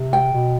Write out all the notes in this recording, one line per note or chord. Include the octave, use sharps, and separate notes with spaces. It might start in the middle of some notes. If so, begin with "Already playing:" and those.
Already playing: C3
G5
B2